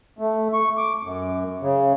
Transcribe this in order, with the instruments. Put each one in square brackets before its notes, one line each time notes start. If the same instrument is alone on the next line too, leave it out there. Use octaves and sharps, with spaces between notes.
[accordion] A3
C#6
D6
F#2
C#3